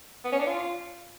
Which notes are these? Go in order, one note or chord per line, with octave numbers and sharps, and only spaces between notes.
B3
C#4
D4
F4